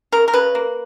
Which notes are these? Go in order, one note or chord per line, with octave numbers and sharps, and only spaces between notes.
C#3 A#4
A#4
C#3 B4
A#3